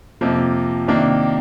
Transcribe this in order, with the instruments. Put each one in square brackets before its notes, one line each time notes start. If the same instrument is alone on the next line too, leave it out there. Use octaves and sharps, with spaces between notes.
[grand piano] F2 C3 F3 A#3
C3 D#3 A#3 D4